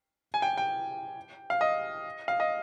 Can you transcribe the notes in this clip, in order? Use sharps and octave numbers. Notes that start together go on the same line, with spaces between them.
G#5
G5
G5
F5
D#5
F5
D#5